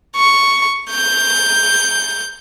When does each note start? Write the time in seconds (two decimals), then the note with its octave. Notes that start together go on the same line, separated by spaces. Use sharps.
0.16 C#6
0.90 G6